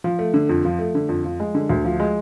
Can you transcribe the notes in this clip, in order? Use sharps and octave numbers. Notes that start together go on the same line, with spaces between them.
F3
A3
D3
F2
F3
A3
D3
F2
F3
G#3
D3
D2
F3
G#3